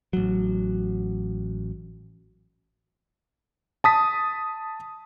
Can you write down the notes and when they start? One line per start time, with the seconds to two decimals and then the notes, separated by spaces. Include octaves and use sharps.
0.13 A1 F#3
3.84 A5 D#6 B6